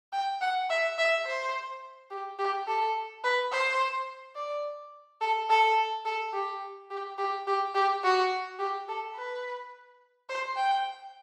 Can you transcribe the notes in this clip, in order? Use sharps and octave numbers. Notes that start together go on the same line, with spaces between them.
G5
F#5
E5
E5
C5
G4
G4
A4
B4
C5
D5
A4
A4
A4
G4
G4
G4
G4
G4
F#4
G4
A4
B4
C5
G5